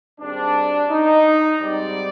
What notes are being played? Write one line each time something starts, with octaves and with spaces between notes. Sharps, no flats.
G#1 G#2 G3 C4 D4
D#4
G#2 G3 C4 D5